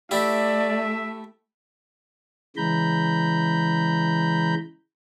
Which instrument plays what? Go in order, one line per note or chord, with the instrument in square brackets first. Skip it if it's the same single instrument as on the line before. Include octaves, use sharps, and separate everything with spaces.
[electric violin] A3 [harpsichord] E4 G4 [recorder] D5 [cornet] E5
[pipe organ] C#3 E3 G#3 A#5 B5 G6